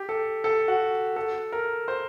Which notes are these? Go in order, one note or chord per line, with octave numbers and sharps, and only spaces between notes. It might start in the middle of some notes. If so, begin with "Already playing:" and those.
Already playing: G4
A4
A4
F#4
A4
A#4
C5